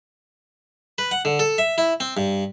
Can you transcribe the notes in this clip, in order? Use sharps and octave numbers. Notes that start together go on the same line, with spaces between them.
B4
F#5
D3
A4
E5
E4
C4
G2